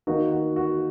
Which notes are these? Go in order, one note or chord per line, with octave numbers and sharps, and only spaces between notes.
D#3 A#3 D#4 F#4
F#4
F#4